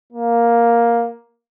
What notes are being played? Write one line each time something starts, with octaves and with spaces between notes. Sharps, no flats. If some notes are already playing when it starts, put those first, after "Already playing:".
A#3